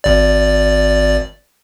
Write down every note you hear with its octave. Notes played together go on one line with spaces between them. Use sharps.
G#1 D5